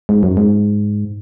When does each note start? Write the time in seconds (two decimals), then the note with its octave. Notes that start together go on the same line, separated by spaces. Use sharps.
0.09 G#2
0.23 F#2
0.37 G#2